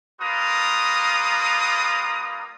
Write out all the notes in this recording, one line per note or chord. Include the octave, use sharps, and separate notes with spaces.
G3 A#3 F4 B4 A#5 D#6